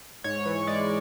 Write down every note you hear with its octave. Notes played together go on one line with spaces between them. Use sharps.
G#2 C#5
E3
G#3 D5